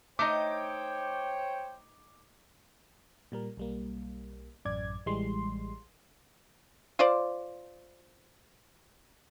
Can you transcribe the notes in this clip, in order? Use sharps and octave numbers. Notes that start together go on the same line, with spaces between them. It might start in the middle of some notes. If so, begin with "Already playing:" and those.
A3 D#4 C5 C#5 D#5 G5 D6
A#2 G3 A#4
B1 G3 A#3
A1 F#2 D5 G#6
A1 E3 G3 G#3 C6
F4 C5 D5